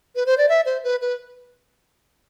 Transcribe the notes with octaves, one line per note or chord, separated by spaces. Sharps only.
B4
C5
D5
E5
C5
B4
B4